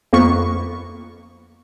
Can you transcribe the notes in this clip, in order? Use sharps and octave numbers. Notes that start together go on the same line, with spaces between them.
F2 A#3 B3 C#6